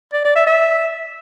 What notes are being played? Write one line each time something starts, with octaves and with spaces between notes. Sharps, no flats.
D5
D5
E5
E5